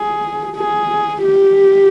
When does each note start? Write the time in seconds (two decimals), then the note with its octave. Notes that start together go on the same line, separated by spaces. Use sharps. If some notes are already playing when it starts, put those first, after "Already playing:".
Already playing: G#4
0.56 G#4
1.24 G4